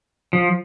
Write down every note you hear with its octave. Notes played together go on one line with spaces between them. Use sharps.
F3